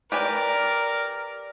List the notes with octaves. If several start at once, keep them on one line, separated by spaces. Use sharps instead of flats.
G4 A#4 B4 D5 G#5